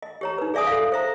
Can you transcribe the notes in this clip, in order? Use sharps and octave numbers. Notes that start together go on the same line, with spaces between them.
D#5
G4 C#5 A#5
D#4 B4
G#4 D5 E5 G#5 D#6
A4 F5
C5 E5 A#5